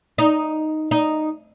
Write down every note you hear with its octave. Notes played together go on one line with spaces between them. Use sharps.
D#4
D#4